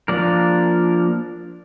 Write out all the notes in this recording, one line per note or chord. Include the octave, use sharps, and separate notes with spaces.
F3 A#3 D4 A#4 D5